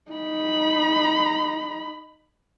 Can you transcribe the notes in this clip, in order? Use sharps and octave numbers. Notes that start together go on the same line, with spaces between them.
D#4 B5